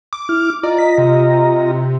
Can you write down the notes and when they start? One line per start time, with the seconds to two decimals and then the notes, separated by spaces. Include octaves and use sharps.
0.13 D6
0.29 E4 F6
0.63 F4 D5 D#5 A#5
0.78 B6
0.98 C3